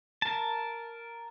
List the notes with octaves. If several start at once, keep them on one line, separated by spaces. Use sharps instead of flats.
A#4 A5